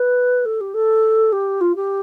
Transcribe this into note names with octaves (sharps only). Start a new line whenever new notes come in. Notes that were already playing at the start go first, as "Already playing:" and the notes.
Already playing: B4
A4
G4
A4
G4
F4
G4